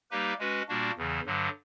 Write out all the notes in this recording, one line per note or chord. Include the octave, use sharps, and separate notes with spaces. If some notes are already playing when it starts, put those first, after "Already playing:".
G3 A#3 D#4 G4 B4
G#3 C#4 F#4 B4
A#2 G3 A#3 D4 F#4
E2 C#3 E3
G2 D3 F#3